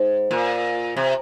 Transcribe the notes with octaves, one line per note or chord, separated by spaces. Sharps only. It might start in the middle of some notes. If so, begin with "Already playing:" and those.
Already playing: G#2
A#2
C3